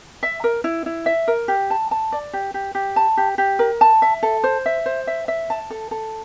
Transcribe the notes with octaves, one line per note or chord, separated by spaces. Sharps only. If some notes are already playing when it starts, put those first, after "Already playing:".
E5
A#4
E4
E4
E5
A#4
G4
A5
A5
D5
G4
G4
G4
A5
G4
G4
A#4
A5
E5
A4
C5
E5
C5
E5
E5
A5
A4
A4